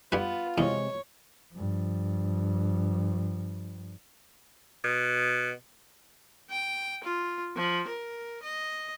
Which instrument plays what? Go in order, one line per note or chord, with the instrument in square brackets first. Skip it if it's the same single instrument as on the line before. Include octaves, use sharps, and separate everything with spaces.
[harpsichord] G2 B4 [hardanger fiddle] B3 [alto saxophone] F4
[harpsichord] E2 [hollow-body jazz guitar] C3 G#3 D#5 [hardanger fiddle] C#5
[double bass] G2 F3
[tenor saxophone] B2
[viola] G5
F4
F3
A#4
D#5